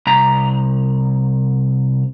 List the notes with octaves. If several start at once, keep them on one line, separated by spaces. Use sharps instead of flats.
C2 A#5